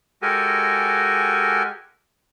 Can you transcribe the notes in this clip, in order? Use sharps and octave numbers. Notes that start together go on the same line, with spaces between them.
G#3 F#4 G4 A4 A#4 G#5